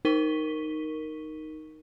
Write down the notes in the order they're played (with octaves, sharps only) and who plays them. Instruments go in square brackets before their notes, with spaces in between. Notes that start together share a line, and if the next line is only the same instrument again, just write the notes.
[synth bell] D#4 A#4 C#6 B6 D#7 G7